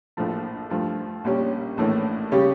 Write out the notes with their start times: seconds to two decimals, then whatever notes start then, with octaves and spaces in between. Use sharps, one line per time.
0.17 A#1 A2 F3 A3
0.70 G2 F3 A3
1.24 A#1 A#2 G3 C#4
1.77 A#1 A2 E3 A3 C#4
2.31 C#3 G3 C#4 G4 C#5